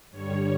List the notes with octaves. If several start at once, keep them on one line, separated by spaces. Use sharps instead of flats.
G2 D3 G3 C#5